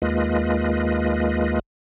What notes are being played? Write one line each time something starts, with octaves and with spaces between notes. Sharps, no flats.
D#2 G#3 A#3 F4 B4 D#5